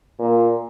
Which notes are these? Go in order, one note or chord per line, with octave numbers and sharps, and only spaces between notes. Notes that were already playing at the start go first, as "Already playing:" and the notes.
A#2